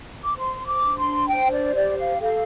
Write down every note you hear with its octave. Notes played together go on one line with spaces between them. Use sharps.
D6
C5 C6
D6
D4
C6
C5 G5
D5
G4 D5
F5
A4 F5